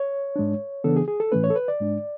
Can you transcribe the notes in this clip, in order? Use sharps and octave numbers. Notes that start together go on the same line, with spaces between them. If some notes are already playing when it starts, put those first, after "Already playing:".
Already playing: C#5
G#2 G#3 D4
C#3 E3 B3 D4 A4
G#4
G#4
A4
A2 E3 A3 C#4 B4
C#5
A4
B4
D5
G#2 G#3 D4